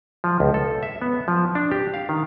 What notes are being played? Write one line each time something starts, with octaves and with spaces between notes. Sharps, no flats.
F3
C#2
A4
E5
B3
F3
D4
G4
F5
D#3